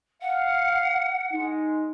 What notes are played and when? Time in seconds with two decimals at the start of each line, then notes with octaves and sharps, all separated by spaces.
0.21 F5 F#5
1.33 G#3 D#4